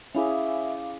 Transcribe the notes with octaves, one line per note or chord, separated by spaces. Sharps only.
C#4 E4 G#4 E5 F5 D6